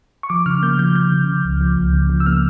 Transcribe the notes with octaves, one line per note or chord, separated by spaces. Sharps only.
C#6
F3 D6
C#3 F6
A#3 G6
F3 G6
F3 G6
C#3
C#3
C#2
F3
C#2
C#3
F3
E6
A#3 F6